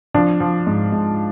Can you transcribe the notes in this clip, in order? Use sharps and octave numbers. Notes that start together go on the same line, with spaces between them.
F3 D4
F3
G#2
G#2